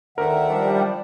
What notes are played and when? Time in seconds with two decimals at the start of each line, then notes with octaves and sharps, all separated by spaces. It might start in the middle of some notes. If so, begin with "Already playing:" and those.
0.18 D2 D#3 A#4 E5 F#5
0.50 F3 G3 D4